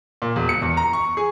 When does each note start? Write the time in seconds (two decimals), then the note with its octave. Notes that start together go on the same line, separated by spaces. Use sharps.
0.22 A#2
0.36 E1
0.49 C#7
0.62 E2
0.77 A#5
0.93 C#6
1.17 G#4